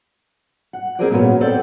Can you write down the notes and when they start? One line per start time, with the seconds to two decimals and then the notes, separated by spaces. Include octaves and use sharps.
0.73 F#5
0.99 A#3 C4 G#4 A#4 C5 D5
1.11 A#2 F#3 B3 C#4 F#4
1.41 B3 C4 A4 C5 D5 F#5